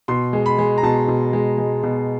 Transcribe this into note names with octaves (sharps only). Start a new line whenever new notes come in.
B2 C6
G#3
B5
G#3
A#5
B2 A5
B2
G#3
G#3
B2